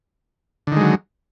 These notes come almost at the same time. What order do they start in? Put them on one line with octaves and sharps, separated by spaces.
D3 D#3 G#3 F#3